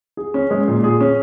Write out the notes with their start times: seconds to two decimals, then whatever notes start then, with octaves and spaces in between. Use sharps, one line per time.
0.17 G#4
0.34 C#4
0.51 G#3
0.68 A#2
0.84 G#4
1.01 C#4